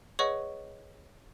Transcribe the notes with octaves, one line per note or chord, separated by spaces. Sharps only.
G#4 B4 C#5 D#5 F#5 C#6